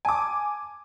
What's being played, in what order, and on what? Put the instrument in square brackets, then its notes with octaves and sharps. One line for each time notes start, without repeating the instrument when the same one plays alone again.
[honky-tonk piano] G#5 D6 [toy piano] A5